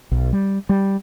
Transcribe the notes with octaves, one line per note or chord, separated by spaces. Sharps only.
B1
G3
G3